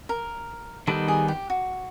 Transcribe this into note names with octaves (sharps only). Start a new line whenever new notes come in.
A#4
D#3 G3 B3 D#4 A4
G#4
G4
F#4